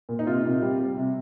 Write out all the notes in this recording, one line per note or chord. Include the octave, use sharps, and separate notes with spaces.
A#2
D#4
C3 F4
C3
G3
G3
C3